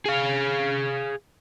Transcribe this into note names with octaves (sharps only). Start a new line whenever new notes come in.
G#4 F5